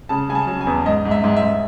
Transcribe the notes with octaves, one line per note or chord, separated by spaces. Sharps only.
C#3 A5
C#3 G#5
A5
F#3
G#5
E2
G#2 D#5
G#2
E5
G#2
E5
G#2